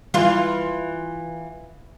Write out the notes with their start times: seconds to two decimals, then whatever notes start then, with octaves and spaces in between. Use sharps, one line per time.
0.14 E3 F4